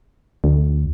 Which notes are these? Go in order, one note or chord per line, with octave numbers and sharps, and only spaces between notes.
D2